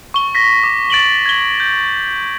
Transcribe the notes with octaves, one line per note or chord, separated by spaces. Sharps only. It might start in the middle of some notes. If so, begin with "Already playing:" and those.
C#6 G7
A#6 B6
D6
A6 D7 F#7 G7
G#6 F#7 G7
G6